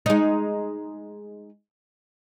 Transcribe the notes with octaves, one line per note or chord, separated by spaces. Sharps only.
G#3 D#4